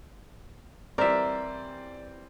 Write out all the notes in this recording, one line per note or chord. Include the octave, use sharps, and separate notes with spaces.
E3 G3 C4 A#4 D5 E5